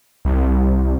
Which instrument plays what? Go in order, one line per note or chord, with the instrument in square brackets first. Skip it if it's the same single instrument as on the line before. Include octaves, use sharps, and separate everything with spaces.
[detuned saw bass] C2